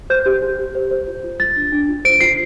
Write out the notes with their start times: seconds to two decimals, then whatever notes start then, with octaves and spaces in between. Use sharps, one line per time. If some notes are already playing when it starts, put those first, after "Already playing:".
0.10 C5 G6
0.26 G4
0.42 G4
0.59 G4
0.75 C5
0.91 C5
1.07 F4
1.24 F4
1.40 F4 A6
1.56 D4
1.72 D4
1.89 F4
2.05 C5 D7
2.21 F4 C7